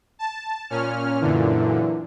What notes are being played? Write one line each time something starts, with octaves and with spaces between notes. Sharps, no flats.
A5
A#2 C#4 F6
F#2 A#2 D3 E3